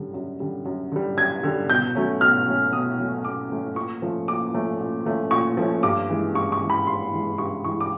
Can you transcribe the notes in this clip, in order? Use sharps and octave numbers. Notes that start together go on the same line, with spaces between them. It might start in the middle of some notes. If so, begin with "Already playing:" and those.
Already playing: F#2 D3 G3
F#2
D3 G3
F#2
D3 G3
F#2 G#6
D3 G3
B2 G6
F#3 A3 C#4
B2 F6
F#3 A3 C#4
B2 D#6
F#3 A3 C#4
B2 D6
F#3 A3 C#4
A#2 C#6
F3 A3 C#4
A#2 D6
F3 A3 C#4
A#2
F3 A3 C#4
A#2 C#6
F3 A3 C#4
G2 D6
E3 G#3
G2 C#6
C#6
E3 G#3
B5
G2 C6
E3 G#3
G2 C#6
E3 G#3 C#6
D6